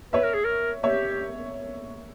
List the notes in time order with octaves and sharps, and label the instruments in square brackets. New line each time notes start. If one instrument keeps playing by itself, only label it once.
[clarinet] B4 [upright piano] C#5 E5
[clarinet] A#4
G#4
A#4
[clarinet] G4 [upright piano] C#5 E5